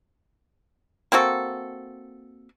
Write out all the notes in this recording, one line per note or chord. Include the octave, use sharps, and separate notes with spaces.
A#3 C4 F#4 A4